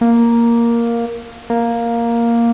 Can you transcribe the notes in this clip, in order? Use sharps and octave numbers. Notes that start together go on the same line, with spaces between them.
A#3
A#3